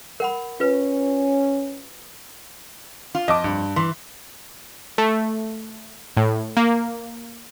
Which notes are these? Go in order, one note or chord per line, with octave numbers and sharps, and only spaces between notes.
A#4 F#5 B5
C#4 F4 B4
F4
F2 D#5 A5 D6
G2
E3 C6
A3
A2
A#3